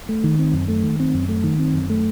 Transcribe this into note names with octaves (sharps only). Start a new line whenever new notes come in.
A3
D#3
C4
F#2
A3
D#3
C4
F#2
A3
D#3
C4
F#2
A3